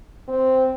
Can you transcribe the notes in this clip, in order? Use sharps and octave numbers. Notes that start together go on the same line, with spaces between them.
C4